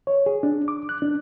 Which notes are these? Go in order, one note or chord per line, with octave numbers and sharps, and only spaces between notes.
C#5
G#4
D4
D6
F#6
D4